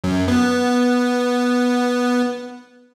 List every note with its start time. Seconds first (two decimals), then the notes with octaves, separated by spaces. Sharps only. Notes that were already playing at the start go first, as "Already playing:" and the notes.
0.04 F#2
0.28 B3